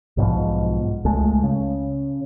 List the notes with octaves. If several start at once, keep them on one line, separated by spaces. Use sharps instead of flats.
B1 G#2 B2 F3
C#2 G#3 A3
C#3